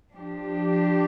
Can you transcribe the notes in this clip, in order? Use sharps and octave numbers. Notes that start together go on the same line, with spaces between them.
F3 D4 G4